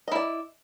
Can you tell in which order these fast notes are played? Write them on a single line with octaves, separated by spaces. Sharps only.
D#5 E4 D5